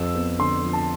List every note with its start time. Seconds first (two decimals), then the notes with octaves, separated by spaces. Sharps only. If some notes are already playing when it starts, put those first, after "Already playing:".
Already playing: F2 E6
0.15 B3
0.39 D3 C6
0.64 F3
0.73 A5